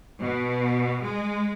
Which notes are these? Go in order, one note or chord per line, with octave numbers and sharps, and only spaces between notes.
B2
G#3